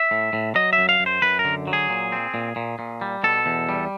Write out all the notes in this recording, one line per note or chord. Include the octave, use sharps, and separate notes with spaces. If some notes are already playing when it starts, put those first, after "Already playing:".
Already playing: E5
A2
A2
F#3 D#5
E5
F#2
F5
F#2
C5
F#2 B4
A#4
D3
F#3
G#4
A#2
C4
A#2
A#2
A#2
G3
B2 A4
E2
G3